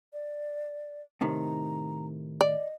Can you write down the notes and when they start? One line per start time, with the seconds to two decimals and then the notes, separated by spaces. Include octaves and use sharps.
0.13 D5
1.21 A2 C3 D#3 A#5
2.41 D5 D#5